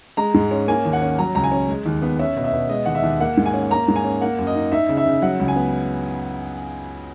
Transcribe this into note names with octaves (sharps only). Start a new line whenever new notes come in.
G#3 A#5
G#2
C#4
A#3 G#5
D#2
F#5
C#4
F#3 A#5
C#2 A#5
G#5
C#4
G#3
D#2
B3
C#4 E5
B2
E5
B2
G#3 D#5
D#2 F#5
E5
D#2
A#3 F#5
G#2
G#5
C#4
A#3 A#5
G#2
G#5
C#4
A#3 F#5
F#2
D#5
D#4
D#4 E5
C#3
E5
C#3
F#3 F#5
C#2
G#5
B3